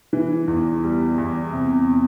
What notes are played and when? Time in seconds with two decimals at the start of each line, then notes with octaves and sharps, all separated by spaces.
0.13 E3
0.48 E2
0.84 G3
1.18 E2
1.52 C3